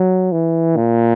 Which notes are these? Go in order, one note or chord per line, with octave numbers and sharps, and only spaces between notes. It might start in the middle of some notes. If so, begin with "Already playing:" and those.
Already playing: F#3
E3
A#2